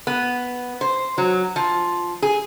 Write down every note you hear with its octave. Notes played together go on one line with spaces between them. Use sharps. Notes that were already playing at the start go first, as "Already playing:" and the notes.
B3
C5
F#3
F3
G#4